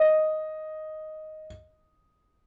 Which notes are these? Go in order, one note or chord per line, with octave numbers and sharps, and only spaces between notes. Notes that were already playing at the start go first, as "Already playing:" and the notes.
Already playing: D#5